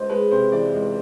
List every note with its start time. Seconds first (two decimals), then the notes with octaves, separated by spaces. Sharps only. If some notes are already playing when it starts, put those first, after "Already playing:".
Already playing: C#2 C5
0.10 G#3 B4
0.31 C3 C5
0.52 E3 D5
0.73 C#2